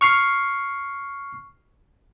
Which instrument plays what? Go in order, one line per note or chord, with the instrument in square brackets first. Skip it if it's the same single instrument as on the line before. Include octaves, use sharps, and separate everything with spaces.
[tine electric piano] C#6 F6 C7